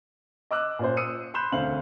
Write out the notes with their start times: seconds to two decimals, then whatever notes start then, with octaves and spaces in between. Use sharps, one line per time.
0.51 D#5 D6 E6 F#6
0.79 A#2 C#4 C5
0.97 D#6 E6 C#7 D#7
1.34 B5 C6 F#6 G6 E7
1.52 E1 D2 C4 F5 F#7